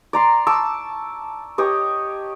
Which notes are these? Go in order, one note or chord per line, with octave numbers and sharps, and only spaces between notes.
D5 A#5 C6
A5 C#6 D6 E6
G4 C#5 D#5